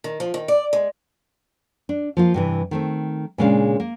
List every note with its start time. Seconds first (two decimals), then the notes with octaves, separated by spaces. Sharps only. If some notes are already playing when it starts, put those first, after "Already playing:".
0.04 D#3
0.20 F3
0.34 D#3
0.48 D5
0.73 G#3
1.89 D4
2.17 F3 A#3 F4
2.34 G2 C3 E3
2.71 D#3 A3 C4
3.38 A#2 C#3 G#3 C#4 D4 F5
3.80 A#3